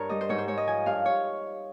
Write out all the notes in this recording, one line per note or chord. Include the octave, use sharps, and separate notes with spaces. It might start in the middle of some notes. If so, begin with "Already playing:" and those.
Already playing: G2 A#4 C#5
G3 D#5
C5
G#2 C#5
C5
G#3 C#5
D#5
F3 G#5
G2 F5
C#5